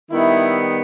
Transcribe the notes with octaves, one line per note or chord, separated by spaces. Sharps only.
D#3 G3 B3 E4